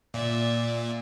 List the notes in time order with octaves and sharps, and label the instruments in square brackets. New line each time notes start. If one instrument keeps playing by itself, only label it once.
[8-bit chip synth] A#2 [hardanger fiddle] D5 E5